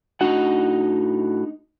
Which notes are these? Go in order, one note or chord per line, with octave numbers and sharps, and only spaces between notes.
A2 D4 D#4 F#4 D#5 F#5